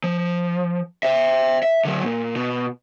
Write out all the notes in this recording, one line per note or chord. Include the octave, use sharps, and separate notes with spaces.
F3
C5 E5
E5
D3 F#3
A#2
B2